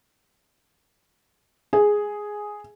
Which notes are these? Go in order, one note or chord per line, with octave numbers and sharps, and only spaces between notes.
G#4